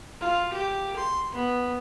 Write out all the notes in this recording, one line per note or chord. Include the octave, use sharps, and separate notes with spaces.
F4
G4
C6
B3